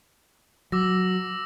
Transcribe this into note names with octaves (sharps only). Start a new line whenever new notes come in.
F#3 D6 E6 A#6